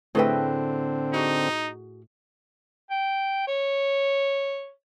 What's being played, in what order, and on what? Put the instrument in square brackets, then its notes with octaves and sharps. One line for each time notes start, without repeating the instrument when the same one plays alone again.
[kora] A2 D#5 E5 [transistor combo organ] D3 C4 [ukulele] G#4 B4 G5
[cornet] D#4 [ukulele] F#4 G#4
[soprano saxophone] G5
C#5